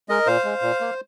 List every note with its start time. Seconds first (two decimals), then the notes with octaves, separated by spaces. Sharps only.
0.09 G#3 A#4 D#5
0.26 A#2 C5 F5
0.44 G#3
0.62 A#2
0.81 A#3